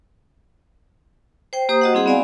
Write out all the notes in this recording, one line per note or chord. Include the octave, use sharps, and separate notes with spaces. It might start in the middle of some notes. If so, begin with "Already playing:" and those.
C5 G5
A#3 G4 C5 A#5 D#6
F#4 D#5 F#5
G3 C4 E4 G#4 F#5
B3 C4 D5 F5 G#5